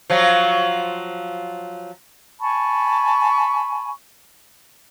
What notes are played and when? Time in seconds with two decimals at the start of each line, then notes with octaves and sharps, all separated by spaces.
0.10 F3 F#3 F4
2.41 G#5 A5 B5 C#6